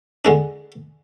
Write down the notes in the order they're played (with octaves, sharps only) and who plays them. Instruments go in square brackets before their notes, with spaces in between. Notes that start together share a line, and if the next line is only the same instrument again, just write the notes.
[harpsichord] D3 G#3 D4